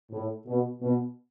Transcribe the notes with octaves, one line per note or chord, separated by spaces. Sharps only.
A2
B2
B2